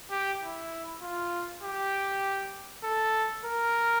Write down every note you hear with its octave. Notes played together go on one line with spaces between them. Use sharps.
G4
E4
F4
G4
A4
A#4